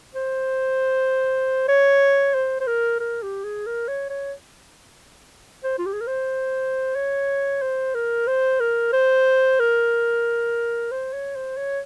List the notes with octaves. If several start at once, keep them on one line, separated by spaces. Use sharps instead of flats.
C5
C#5
C5
C5
A#4
A#4
G4
G#4
A#4
C#5
C#5
C5
F4
G4
G#4
A#4
C5
C#5
C5
A#4
C5
A#4
C5
A#4
C5
C#5
C5
C#5